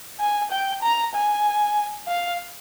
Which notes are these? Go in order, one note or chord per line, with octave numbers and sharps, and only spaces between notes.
G#5
G5
A#5
G#5
F5